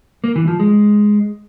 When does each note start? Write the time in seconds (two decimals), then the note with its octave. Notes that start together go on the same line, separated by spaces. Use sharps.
0.24 A#3
0.36 E3
0.48 F3
0.60 G#3